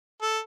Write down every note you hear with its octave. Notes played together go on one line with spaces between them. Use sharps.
A4